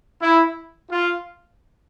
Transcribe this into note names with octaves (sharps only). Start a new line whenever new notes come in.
E4
F4